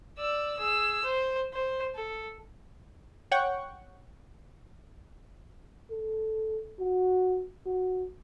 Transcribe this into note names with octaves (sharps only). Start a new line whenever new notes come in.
D5 E6
G#4 E6
C5
C5
A4
C#5 F#5 G5 C#6
A4
F#4
F#4